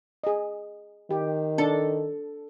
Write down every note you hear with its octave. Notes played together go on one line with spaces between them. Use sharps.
G#4 D#5
D#3 G4
D4 A4